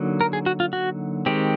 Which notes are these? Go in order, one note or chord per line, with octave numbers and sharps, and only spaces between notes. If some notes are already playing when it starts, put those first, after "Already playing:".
Already playing: D3 F#3 A#3 D#4
A#4
G#4
F#4
F4
F#4
D#3 G#3 C4 G4